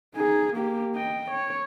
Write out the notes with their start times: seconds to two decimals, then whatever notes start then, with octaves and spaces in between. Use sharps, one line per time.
0.15 D#4 G#4
0.53 A#3 G4
0.95 D#5 G5
1.31 C#5